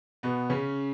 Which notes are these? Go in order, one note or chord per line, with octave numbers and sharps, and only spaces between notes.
B2 B3
C#3 C#4